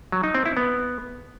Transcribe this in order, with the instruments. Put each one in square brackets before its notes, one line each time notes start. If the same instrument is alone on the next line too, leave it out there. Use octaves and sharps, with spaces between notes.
[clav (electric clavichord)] F#3
D#4
C4
E4
B3